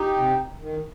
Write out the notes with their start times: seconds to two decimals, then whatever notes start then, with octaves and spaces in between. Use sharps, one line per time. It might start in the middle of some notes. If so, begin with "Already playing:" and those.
Already playing: D#4 G4
0.17 C3
0.61 D#3